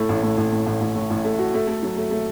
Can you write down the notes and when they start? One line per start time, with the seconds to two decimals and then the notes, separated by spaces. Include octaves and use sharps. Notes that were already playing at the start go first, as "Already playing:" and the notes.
Already playing: A2 A3
0.09 A1
0.23 A2
0.37 A1
0.52 A2
0.66 A1
0.81 A1
0.96 A2
1.10 A1
1.24 A3
1.39 F#4
1.54 A3
1.67 A3
1.83 F#3
1.97 A3
2.11 A3